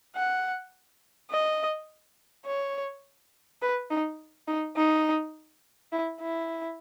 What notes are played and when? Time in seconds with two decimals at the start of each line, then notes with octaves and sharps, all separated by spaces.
0.16 F#5
1.31 D#5
2.46 C#5
3.62 B4
3.90 D#4
4.48 D#4
4.77 D#4
5.92 E4
6.21 E4